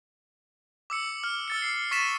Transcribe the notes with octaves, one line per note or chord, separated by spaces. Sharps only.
D6 E6 C#7
F6
E6 A6 C#7
C7
C#6 A6 B6 D#7 E7